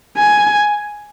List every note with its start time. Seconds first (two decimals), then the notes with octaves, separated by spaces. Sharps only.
0.17 G#5